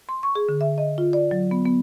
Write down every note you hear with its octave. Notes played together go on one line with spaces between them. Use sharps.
C6
C#6
G#4
D3
E5
D#5
F4
D5
F#3
B3
B3